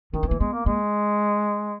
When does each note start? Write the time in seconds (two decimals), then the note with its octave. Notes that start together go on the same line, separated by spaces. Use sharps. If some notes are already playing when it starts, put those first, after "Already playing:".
0.13 D#3 C#4
0.23 B3
0.27 E3
0.31 A#3
0.40 G#3 B3
0.53 A#3
0.66 G#3 A#3